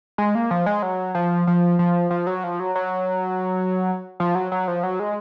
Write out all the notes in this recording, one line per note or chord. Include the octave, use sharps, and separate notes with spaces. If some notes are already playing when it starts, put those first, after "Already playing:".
G#3
A#3
F3
G#3
F#3
F3
F3
F3
F3
F#3
F3
F#3
F#3
F3
F#3
F#3
F3
F#3
G#3